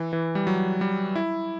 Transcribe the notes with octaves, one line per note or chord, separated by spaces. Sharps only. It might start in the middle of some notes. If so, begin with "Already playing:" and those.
Already playing: E3
E3
G3
F#3
G3
E4